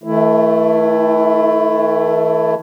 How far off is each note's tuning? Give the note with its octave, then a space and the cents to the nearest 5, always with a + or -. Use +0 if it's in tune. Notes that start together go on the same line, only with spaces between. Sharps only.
E3 -45 A3 +0 E4 +15